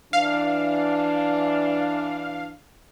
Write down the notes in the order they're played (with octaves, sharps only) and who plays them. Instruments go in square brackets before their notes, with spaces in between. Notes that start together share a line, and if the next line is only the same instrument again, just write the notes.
[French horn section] E3 D4 [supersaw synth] F5